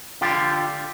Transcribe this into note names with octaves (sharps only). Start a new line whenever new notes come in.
D3 F4 G4